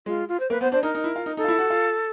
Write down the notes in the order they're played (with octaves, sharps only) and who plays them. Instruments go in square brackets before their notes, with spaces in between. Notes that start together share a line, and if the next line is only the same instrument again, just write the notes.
[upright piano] G#3 [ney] F4
[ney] F4
C5
[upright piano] A#3 [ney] B4
[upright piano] B3 [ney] C5
[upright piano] D4 [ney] C5
[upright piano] D#4 [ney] A#4
[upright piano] D#4
E4
F4
D#4
[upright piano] D#4 [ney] A4
[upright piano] F4
E4
F#4
F4